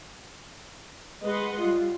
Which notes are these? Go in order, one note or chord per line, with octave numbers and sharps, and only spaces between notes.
G#3 B4 D#5 F#5 C6
G3 F4